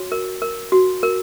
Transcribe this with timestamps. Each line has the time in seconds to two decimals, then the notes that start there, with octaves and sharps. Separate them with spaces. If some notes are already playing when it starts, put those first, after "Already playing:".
Already playing: F#4 C#5
0.12 A#4
0.42 A#4
0.72 F#4
1.03 A#4